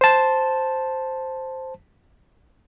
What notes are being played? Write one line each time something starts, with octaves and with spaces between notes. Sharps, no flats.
C5 A5